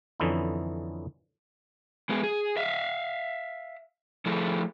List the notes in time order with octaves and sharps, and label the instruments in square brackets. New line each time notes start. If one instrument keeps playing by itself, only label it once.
[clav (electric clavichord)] F2 D3 E3 C#4 D#4 E4
[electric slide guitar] G#3 B3 G#4
G#4
E5 F5
F3 A3 E4 G#4 A4